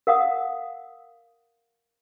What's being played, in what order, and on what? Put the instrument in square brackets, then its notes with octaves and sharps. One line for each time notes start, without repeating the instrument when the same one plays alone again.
[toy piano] A#4 F5 F#5 D#6